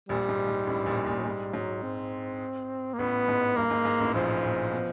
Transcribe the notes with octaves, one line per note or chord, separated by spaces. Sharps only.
A#1 A#2 G3
G#2
G#2
A1 A2
A#1 A#2
A#1 A#2
F#3
G#2 G3
G#2 F#3
C4
A#3
A1 A2 B3
G#2
G2 A#3
G#2
G#2
A1 A2
A#1 A#2 F3
A#1 A#2
B2